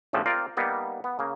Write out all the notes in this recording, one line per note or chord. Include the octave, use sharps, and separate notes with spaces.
G1 A2 C#3 E3 F3 G3
C4 F4 A#4 D5
G3 A#3 B3 D#4
B3
C#3 A#3